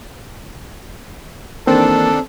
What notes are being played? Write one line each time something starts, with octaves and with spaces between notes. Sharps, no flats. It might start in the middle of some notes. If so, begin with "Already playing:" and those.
D#3 E3 A#3 C4 D4 A4